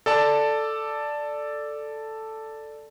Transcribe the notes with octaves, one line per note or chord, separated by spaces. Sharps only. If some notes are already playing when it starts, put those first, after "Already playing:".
A4 D5 A5